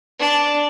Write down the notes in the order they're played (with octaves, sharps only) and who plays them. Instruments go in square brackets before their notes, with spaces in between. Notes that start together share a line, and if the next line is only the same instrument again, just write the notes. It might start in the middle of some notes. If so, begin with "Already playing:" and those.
[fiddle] D4